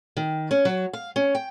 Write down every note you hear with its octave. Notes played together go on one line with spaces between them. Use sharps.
D#3
C#4
F#3
F5
C#4
G5